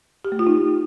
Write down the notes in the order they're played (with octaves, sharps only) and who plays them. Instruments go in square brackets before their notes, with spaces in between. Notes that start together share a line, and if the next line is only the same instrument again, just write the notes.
[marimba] G4
A3
F4
D#4